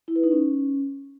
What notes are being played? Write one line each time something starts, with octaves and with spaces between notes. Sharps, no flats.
E4
B4
D#4
C#4